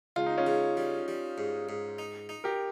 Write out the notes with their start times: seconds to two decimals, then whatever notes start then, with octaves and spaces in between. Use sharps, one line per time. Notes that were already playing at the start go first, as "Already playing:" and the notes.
0.16 C#2 F4
0.26 D#4
0.38 C#4 F4
0.47 C#3
0.77 G3
1.08 G3
1.38 G#2
1.69 G#2
1.99 D#4
2.29 D#4
2.44 G4 A#4